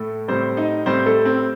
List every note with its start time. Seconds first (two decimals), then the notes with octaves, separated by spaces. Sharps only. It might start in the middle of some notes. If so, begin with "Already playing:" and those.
Already playing: A2 A3 A4
0.28 A2 G3 C4 C5
0.57 D#4 D#5
0.86 A2 G3 C4 C5
1.06 A3 A4
1.25 C4